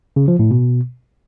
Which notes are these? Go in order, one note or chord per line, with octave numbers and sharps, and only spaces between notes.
C#3
F3
A2
B2